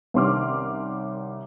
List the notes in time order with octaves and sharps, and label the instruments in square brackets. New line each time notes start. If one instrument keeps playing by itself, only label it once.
[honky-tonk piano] C2 D#3 C#4 C6 D6 F6